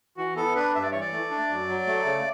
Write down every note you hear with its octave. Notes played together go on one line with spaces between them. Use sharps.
E3 F#4
B3 A4
D4 B4
G2 E5
D5
E3 C#5
D5
A3
D4
F#2
F#3
A3
C#3